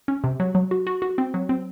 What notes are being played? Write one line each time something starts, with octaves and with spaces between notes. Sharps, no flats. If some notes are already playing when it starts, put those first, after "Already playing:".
C#4
C3
F#3
F#3
F#4
F#4
F#4
C4
F#3
C4